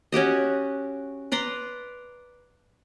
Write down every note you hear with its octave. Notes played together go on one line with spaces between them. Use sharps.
C#4 F#4 G4 D#5
B4 D5 A#5 C6